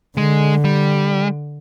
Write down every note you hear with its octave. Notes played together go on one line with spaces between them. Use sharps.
D3 G#3
G3